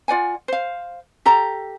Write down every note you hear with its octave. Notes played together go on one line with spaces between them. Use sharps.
F4 D5 F#5 G#5
C5 F5
G4 A4 A#5